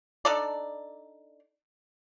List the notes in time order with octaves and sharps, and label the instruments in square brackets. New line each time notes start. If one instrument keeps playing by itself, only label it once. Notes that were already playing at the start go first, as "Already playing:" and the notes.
[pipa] D4 D#4 A4 D5